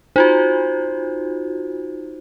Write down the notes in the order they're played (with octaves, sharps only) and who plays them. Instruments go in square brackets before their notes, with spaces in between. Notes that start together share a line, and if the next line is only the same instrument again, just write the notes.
[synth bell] D#4 F4 F#4 [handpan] C5